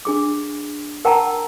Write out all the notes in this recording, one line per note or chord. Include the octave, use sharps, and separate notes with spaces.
D4 G#4 D6
A#4 F#5 G5 A5 A#5